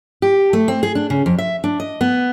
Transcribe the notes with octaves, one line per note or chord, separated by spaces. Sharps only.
G4
A3
C4
G#4
D4
C#3
F2
E5
D4
D#5
B3